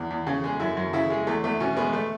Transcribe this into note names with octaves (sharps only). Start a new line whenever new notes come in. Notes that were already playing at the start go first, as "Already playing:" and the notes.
Already playing: E2
E2
C#3
G#3
F#2 E4
F#2
C#3 E4
G#3
E2 A3
E2 A3
B2 C#4
G#3 B3
A3